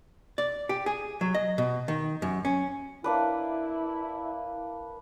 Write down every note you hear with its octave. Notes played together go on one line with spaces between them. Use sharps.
D5
G4
G#4
F#3
D#5
B2
D#3
F#2
C#4
A#3 D4 E4 B4